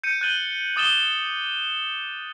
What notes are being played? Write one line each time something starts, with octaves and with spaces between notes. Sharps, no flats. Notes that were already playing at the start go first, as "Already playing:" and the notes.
G6 C#7 D#7
F#6 G6 A6 D#7 F#7 G7
D6 D#6 A6 E7 G7